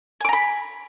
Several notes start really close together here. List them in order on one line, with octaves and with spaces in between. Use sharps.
G#5 D6 A#5 B5